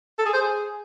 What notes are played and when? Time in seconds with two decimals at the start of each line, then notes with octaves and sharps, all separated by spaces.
0.18 A4
0.26 G#4
0.33 C5
0.41 G#4